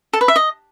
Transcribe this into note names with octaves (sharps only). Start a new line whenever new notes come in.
A4
B4
E5
D#5